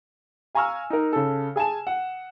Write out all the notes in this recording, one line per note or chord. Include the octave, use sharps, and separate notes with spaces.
F5 G#5 A#5 C#6 E6 F6
D#4 A#4
C#3 A4
G#4 G#5 A5 E7
F#5